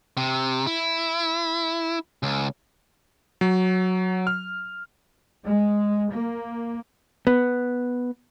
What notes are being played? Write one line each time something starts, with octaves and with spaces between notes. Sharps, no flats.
C3
E4
C#2
F#3
F6
G#3
A#3
B3